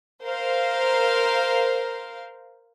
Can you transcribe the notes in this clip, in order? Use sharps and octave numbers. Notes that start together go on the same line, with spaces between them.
A#4 C5 F5